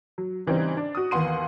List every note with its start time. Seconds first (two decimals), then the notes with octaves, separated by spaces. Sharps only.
0.18 F#3
0.47 C#3 E3 G3 C4 D#4
0.77 D4
0.95 F#4 D#6
1.11 D#2 E3 B3 F#5 C6 D#7